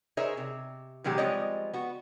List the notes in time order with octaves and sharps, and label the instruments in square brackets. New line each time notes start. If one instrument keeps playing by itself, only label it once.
[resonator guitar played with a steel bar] D#4 G#4 A#4 C5 C#5 E5
C3
B2 D#3 F#3 G#3 G4
F3 G3 G#3 C4 C#5 D#5
B3 F#4